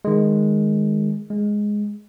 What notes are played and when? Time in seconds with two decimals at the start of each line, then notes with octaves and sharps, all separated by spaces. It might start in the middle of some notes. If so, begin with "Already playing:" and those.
0.05 D#3 G#3
1.30 G#3